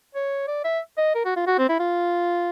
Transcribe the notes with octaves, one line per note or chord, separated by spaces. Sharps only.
C#5
D5
E5
D#5
A#4
F#4
F4
F#4
C4
E4
F4